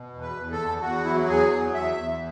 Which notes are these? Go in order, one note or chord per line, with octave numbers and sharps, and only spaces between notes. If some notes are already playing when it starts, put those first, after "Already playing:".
Already playing: B2
E2
B4
E2
A4
E2
E2 F#4
F#3 E4
F#4
E2 G#4
F#3
E2 E5
E2